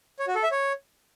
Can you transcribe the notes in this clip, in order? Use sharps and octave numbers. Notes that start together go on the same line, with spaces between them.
C#5
F#4
A4
E5
C#5